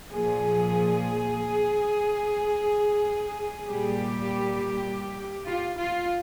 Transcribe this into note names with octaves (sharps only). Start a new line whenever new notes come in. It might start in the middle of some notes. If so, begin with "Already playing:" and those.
A#2 F3 G#4
A#2 G3 G4
F4
F4